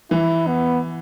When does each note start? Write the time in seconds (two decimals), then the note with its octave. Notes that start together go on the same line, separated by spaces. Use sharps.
0.11 E3 E4
0.47 B3